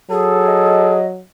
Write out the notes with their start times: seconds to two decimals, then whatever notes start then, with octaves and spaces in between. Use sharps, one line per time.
0.10 F#3 G#4 A4
0.48 D#5